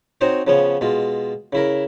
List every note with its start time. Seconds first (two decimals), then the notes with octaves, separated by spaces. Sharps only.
0.21 C4 D#4 F#4 C5 C#5
0.47 C#3 F3 B3 C#4 C#5
0.81 B2 G#3 F4
1.53 C#3 E4 A#4